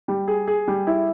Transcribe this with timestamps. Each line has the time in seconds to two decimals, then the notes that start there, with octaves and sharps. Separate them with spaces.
0.08 G3
0.28 G#4
0.47 G#4
0.68 G3
0.87 E4